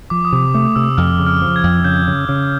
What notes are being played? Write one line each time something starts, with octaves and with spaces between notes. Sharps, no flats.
F3 D6
D#6
C3 D6
A3 D6
C3 E6
F2 F6
C#3
F6
F3
G#6
F2
C#3 G6
C#3
C#3